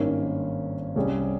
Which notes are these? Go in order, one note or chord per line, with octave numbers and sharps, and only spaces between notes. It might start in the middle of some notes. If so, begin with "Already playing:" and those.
Already playing: G#1 G2 D#3 A#3 C#4
C2 C3 G3 C#4 G#4